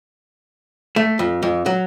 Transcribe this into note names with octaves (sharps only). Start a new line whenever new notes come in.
A3
F2
F2
F#3